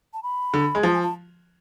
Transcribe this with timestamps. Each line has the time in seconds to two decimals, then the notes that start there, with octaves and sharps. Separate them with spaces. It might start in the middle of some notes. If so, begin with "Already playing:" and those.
0.14 A5
0.23 B5
0.54 D3
0.75 G#3
0.83 F3 A5
0.93 G#5
1.02 A5